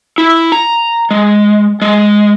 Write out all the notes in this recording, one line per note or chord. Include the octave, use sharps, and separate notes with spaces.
E4
A#5
G#3
G#3